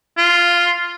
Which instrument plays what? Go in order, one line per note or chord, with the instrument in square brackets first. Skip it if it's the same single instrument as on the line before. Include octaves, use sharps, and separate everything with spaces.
[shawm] F4